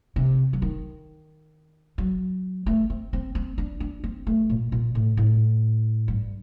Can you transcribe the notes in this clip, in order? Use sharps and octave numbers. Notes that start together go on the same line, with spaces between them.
C3
F#3
D#3
F#3
A3
C4
C4
C4
D4
D4
C4
A3
A#2
A#2
A2
A2
G2